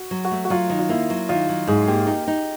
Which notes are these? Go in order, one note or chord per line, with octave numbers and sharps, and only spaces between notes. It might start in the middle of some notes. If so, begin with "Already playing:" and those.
Already playing: F#4
F#3
F#4
A3
F#4
F#3 F4
D#3
F4
A#3 E4
F#3
D#3 F4
F#3
G#2 G#4
A#3 G4
D#4 G4
D#4